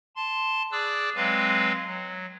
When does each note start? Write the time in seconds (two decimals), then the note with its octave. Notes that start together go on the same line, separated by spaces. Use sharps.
0.16 A5 C6
0.72 G#4 D5 D6 E6 F#6
1.15 F#3 G#3 C4 B4 F5
1.87 F#3